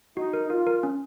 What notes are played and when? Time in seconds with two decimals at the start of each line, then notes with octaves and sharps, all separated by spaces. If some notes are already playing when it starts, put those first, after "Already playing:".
0.17 D#4 F#4
0.33 A#4
0.50 F4 A#4
0.67 A#4
0.83 C#4